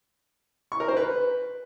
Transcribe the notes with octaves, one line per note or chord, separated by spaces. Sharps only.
C#6
A#4
C5
B4